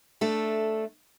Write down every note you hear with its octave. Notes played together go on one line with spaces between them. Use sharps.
A3 D4 A4